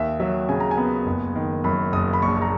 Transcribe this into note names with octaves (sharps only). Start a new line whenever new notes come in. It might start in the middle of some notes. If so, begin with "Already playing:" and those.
Already playing: D#2 E5
F#3 E5
C#3 G#5
A#5
G#5
B3
F#1
D#3
F#2 B5
F#1 D#6
B5
A#1 C#6
A#5